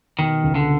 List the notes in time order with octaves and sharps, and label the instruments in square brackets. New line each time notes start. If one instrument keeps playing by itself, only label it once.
[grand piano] B2 [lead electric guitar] D#3
[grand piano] C#2
[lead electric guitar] D3